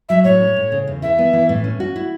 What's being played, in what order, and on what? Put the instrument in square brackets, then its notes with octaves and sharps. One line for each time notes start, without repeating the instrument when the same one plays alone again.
[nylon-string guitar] F#3 [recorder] E5
[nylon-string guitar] A2 [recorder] C#5
[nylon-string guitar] C#4
A2
C#3
E2
[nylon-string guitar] E3 [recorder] E5
[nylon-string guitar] B3
E3
A2
C#4
F#4
E4